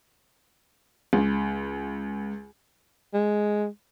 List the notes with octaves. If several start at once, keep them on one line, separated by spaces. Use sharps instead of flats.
C#2
G#3